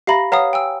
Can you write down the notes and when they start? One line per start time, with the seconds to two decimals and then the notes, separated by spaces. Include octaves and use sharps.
0.07 G4 E5 F5 A#5 B5 A#6
0.32 B4 C#5 F5 F#5 A#5 D#6
0.53 G5 G#5 E6